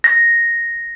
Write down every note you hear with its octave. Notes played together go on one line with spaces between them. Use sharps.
A#6